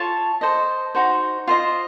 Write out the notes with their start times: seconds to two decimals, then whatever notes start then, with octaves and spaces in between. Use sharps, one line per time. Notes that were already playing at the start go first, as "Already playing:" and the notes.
Already playing: F4 A4 C#5 A5
0.41 A4 C5 D#5
0.95 D#4 F#4 C5
1.47 F4 C5 D#5